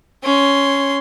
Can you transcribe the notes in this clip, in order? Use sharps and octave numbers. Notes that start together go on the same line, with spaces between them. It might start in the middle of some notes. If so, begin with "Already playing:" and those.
C#4 C6